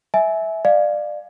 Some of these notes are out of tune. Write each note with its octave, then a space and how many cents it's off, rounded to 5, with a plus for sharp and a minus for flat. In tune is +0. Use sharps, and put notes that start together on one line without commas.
E5 -15 G#5 +20
D5 +25 F5 +0